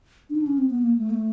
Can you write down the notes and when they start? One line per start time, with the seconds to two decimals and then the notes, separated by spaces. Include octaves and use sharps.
0.30 D4
0.35 D#4
0.42 D4
0.47 C#4
0.58 C4
0.70 B3
0.82 A#3
0.98 A3
1.10 A#3
1.14 A3